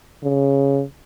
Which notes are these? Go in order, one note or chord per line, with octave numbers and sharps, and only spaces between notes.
C#3